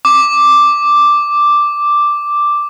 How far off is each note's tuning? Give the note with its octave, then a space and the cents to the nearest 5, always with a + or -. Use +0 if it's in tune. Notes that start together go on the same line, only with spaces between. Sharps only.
D6 +0